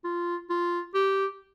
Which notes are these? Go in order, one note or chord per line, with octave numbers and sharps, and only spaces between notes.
F4
F4
G4